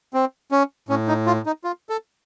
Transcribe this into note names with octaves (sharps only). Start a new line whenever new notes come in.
C4
C#4
A2 C#4
D#4
F4
D#4
F4
A4